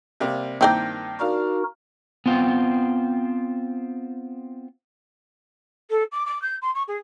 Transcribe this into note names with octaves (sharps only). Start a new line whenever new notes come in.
C3 G3 A#3
G2 D#3 A#3 C4 E4 G5
D4 D#4 F#4 A#4 F5
B3 C4 F4 G5
A4
D6
D6
G6
C6
C#6
G#4